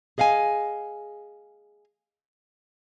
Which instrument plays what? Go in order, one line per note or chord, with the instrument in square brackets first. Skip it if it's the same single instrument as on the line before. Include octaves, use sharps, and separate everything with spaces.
[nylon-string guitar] G#4 D#5 F5 F#5 G#5